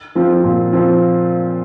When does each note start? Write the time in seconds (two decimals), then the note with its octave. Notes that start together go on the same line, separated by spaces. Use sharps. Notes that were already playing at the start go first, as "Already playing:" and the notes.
0.15 F3 C4 F4
0.44 A#2
0.73 F3 C4 F4